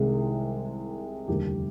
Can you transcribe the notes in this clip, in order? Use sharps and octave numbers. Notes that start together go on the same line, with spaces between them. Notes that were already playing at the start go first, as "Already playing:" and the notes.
Already playing: C2 C3 D#3 G#3 G#4
F1 D#2 D3 G3 G4